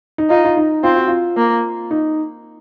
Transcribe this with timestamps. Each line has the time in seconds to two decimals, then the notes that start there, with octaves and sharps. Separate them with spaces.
0.18 D#4
0.30 D#4 F4
0.45 F4
0.57 D#4
0.84 C4 F4
0.96 F#4
1.08 F4
1.37 A#3
1.91 D#4